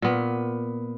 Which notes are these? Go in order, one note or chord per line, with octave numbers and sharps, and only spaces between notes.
A#2 B3